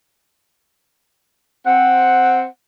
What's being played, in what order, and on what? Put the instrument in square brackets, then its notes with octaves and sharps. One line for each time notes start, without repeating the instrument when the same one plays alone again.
[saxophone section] C4 F#5